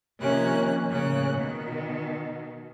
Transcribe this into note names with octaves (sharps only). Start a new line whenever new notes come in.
C3 D#3 F3 A#3 C#4 F#6
A2 C#3 A#3 C#4 F#6
B2 D#3